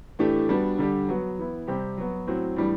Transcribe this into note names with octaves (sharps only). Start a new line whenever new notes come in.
A2 E3 A3 D4 G4
G3 B3 D4 F#4
D3 G3 D4 G4
F#3 B3 F#4
E3 B3 E4
C3 G3 C4 G4
F#3 B3 F#4
A2 F#3 C4 F#4
A2 E3 G3 D4